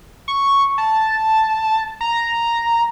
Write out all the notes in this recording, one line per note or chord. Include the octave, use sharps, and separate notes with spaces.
C#6
A5
A#5